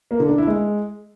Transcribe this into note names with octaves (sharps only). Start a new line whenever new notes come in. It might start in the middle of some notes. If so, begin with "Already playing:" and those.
A#3
D3
D4
E4
G#3